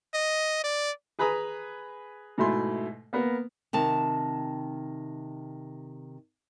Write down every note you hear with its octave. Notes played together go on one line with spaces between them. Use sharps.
D#5
D5
G#4 B4 G#5 A#5 B5 D#6
G#2 B2 A3 E4 C6
A#3 B3 A#4
C3 D#3 A5